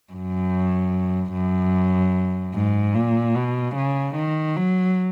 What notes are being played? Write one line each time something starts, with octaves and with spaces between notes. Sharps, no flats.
F#2
F#2
G#2
A#2
B2
C#3
D#3
F#3